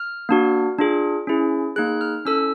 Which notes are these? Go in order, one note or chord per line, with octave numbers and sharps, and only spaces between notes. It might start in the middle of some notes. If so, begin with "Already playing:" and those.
Already playing: F6
A#3 D4 F#4
D4 F4 G#4
C#4 E4 G#4
A#3 D#4 G#4 F#6
F6
C#4 E4 A4 E6